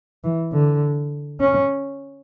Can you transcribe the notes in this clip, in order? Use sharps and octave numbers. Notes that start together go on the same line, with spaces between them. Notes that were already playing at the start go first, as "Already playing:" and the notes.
E3
D3
C#4